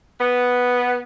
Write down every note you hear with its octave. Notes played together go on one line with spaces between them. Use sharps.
B3